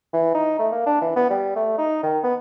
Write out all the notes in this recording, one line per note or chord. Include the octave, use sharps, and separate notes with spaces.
E3
D#4
A3
A#3
D4
E3
B3
G3
A3
D#4
D#3
B3